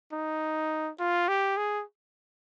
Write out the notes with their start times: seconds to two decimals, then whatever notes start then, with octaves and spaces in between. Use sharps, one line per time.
0.13 D#4
1.00 F4
1.28 G4
1.57 G#4